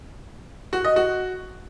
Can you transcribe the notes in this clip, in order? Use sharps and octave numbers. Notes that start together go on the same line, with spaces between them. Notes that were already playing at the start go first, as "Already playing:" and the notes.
F#4
D#5
F#4